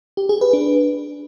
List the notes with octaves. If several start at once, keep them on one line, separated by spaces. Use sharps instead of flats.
G4
G#4
B4
D4